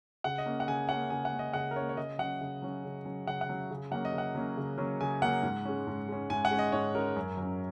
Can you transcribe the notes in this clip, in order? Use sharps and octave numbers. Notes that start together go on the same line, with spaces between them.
C#3 F#5
D#5
A#3 C#4
F#5
C#3 G#5
C#4 F#5
A#3
C#3 G#5
F#5
A#3 C#4
D#5
C#3 F#5
A#4
A#3 C#4 C#5
C#5
C#3 D#5
F#3 C#4 F#5
C#3
F#3 C#4
C#3
F#3 C#4
C#3 F#5
F#5
F#3 C#4
C#3
F#3 A#3 C#4 F#5
D#5
C#3
F#5
F#3 A#3 C#4
C#3
F#3 A#3 C#4
C#3 G#5
F#3 A#3 C#4 F#5
G#2
G#3 C#4
G#2
G#3 C#4
G#2 G#5
F#5
G#3 C#4
D#5
G#2 C#5
G#3 C#4 A#4
F#2
F#3 C#4